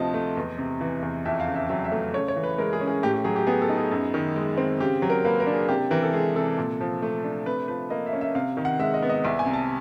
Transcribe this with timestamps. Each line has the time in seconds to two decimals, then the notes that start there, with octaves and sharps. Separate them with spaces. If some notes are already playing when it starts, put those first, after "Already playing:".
Already playing: D2 C3 F3 D#5 A5
0.14 A3
0.37 E2
0.58 C3
0.81 E3
1.02 E2
1.25 F2 E5
1.40 F5
1.48 C#3
1.55 E5
1.69 F#3 E5
1.84 E5
1.92 A3
2.14 C#3 C#5
2.28 C#5
2.36 E3
2.44 B4
2.58 G#3 A#4
2.73 G#4
2.81 C#4
2.87 G#4
3.03 A2 G4
3.14 G4
3.24 F#3 G#4
3.36 G4
3.47 B3 G#4
3.62 A4
3.69 D#4
3.77 G#4
3.91 F#2
4.14 D#3
4.36 G#3
4.58 C4
4.80 C#3 G4
5.02 F#3
5.10 A#4
5.25 A#3 B4
5.40 A#4
5.47 D4
5.54 G#4
5.69 C3 G4
5.91 E3 A#4
6.03 A4
6.13 G#3 G#4
6.35 C3 A4
6.58 A#2
6.81 F3
7.02 A3
7.24 D4
7.46 C3 B4
7.68 F3 B4
7.90 A#3 D#5
8.06 E5
8.13 C#4
8.21 E5
8.35 C3 F5
8.57 D#3
8.65 F#5
8.79 G#3 E5
8.94 D#5
9.02 B3
9.10 D#5
9.24 C2 E5
9.39 G#5
9.46 C3
9.53 A5